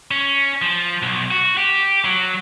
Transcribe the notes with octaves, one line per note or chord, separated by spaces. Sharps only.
C#4
F3
B1
F#4
G4
F#3